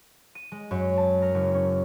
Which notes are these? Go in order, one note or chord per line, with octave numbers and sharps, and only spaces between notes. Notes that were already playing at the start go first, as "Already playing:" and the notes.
D#7
G#3
F#2
A5
A#4
F#1
C#4